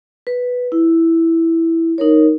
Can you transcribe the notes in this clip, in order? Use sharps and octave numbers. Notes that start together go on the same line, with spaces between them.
B4
E4
D#4 A#4 C#5